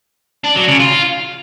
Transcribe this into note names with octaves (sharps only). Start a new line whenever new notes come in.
D4
F#3
C#3
F4